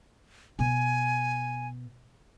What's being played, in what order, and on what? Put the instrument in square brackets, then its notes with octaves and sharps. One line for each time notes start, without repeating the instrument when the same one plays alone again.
[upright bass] B2 [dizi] G#5